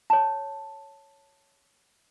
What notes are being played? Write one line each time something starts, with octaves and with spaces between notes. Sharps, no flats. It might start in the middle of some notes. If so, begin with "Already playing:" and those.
C#5 A5